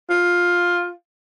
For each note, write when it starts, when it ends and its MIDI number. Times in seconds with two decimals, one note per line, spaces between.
0.10 0.91 65